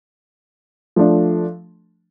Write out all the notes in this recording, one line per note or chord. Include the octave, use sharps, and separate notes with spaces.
F3 A3 D4